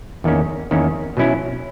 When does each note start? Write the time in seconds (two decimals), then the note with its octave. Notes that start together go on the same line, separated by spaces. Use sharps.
0.24 E2 D#3 A#3 C#4
0.71 E2 D#3 A#3 C#4
1.17 B2 F#3 C#4 E4